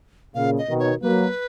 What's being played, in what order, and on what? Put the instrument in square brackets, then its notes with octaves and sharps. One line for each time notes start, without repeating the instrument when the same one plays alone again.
[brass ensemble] A#2 C#3 [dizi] F5
[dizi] D#5
[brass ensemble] B2 D#3
[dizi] C#5
[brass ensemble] F#3 A#3 [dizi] B4